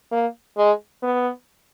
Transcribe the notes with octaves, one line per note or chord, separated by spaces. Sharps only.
A#3
G#3
B3